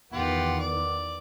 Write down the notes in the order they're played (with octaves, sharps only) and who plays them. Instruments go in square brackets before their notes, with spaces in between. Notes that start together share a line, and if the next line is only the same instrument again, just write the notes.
[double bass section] E2 D#3 B3 [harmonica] F4 G4 F#5
[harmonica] D5